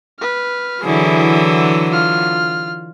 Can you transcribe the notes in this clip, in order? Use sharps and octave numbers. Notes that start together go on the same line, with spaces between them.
B4 F6
D3 E3 F#3 E4 G#4
F4 F6